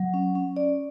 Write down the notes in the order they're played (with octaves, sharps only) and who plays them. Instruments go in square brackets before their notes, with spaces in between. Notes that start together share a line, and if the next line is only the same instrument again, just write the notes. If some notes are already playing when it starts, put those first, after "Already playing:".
Already playing: [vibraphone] F#3
C#4
C#4
D5